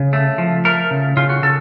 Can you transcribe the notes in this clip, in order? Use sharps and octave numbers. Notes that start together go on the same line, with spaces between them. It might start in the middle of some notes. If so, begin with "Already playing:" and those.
Already playing: C#3
A3
F3
A3 A#4
C#3
C#3 F4
F#4
C#3 A4